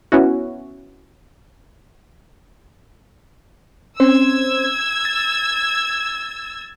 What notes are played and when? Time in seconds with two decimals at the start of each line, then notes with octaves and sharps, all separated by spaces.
0.12 B3 C#4 E4 F#4
4.00 C4 C#4 C5 E6 G#6
5.05 A6